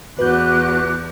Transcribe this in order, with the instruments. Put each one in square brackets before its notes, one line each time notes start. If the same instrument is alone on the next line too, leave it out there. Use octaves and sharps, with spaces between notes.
[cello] E2 [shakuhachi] F#4 [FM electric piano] B4 G6 [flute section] D6 F#6